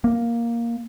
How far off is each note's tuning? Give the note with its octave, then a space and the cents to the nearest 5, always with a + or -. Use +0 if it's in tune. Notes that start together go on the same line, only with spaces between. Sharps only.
A#3 +5